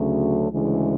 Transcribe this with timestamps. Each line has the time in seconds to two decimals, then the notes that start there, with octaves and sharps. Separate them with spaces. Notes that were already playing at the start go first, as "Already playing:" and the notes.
Already playing: D2 C#3 F#3 A3
0.51 D2 C#3 E3 G#3